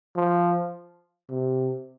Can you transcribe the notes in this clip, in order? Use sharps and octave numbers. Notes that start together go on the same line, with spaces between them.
F3
C3